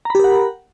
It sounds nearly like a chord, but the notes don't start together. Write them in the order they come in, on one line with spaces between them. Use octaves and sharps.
A#5 B5 G4 A#4 F#5